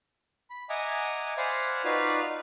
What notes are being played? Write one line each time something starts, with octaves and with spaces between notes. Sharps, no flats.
B5
D#5 E5 F#5 G#5 A#5 D6
C5 D5 F5 F#5 G#5 B5
D#4 F4 F#4 B4 D5 F5